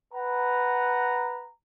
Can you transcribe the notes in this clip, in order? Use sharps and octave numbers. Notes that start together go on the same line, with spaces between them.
B4 F#5 A#5